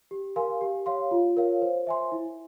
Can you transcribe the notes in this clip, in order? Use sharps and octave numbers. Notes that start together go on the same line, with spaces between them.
G4
A#4 F5 G#5 C6
G4
C#5 F5 C6
F4
A#4 C#5 F5
C5
E5 G#5 C6
E4